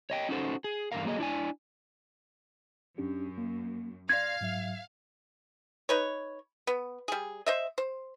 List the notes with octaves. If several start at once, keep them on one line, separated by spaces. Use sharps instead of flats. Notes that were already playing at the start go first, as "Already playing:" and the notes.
C#5 D#5 G5
C#4 D#4 F#4 A4 C5
G#4
E2 G2 D3 A3 A#4 F5
F#3 A#3 G#4 D#5
D4 E4 D5 G#5
F#2 C#4 D4 G4
A#3
D5 F5 C6 G#6 A#6
G#2 F#3 E5
D#4 B4 C#5
B3
G3 G#4
C5 D#5 E5
C5